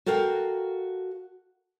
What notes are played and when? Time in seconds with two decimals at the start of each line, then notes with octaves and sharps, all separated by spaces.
0.06 F#4 A4 A#4 F5 G5